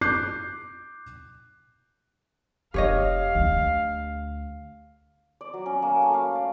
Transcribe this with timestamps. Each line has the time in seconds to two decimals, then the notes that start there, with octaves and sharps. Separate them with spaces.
0.01 D6 F#6 G6 C7
2.74 F1 G4 C#5 D#5 F5
3.35 D2
5.41 D5
5.54 F#3
5.66 C#4
5.82 A#3
6.02 A3
6.14 F5
6.35 D5